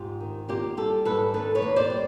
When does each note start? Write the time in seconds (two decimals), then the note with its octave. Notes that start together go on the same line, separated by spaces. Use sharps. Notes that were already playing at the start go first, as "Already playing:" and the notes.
Already playing: G#2 F4 G4
0.21 D#3
0.48 A#3 F4 G4
0.77 G3 G4 A4
1.05 G#2 A4 B4
1.34 D#3 A4 B4
1.55 B4 C#5
1.62 A#3
1.76 C5 D5
1.90 G3